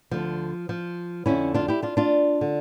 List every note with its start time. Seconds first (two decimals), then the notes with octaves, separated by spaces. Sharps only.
0.11 D2 D3 F3
0.69 F3
1.26 F2 D3 C#4 E4
1.54 D4 F4
1.68 E4 G4
1.83 D4 F4
1.97 D4 F4
2.41 D3